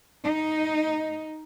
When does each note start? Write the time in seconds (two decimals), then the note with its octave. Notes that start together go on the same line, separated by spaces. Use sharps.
0.24 D#4